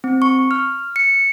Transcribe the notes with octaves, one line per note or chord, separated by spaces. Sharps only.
C4
C#6
F6
C#7